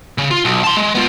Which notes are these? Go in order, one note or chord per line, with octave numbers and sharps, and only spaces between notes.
C#3
F4
B1
A5 C6
G#3
B3 F4